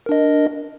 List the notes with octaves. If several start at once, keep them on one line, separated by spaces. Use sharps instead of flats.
D4 A#4 D#5